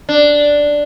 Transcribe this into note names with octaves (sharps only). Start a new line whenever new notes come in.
D4